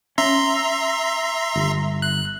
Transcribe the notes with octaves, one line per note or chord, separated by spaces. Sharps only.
C#4 E5 A#5 C6
G1
F#6